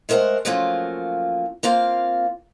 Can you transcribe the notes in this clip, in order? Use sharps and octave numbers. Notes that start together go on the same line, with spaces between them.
G#3 A3 A#4 C5 F#5
F3 F#3 A3 A#3 C#4 F4
A#3 C4 F4 F5